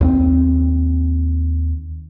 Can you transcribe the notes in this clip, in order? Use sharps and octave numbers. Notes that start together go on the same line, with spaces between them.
D#2 A#3 C4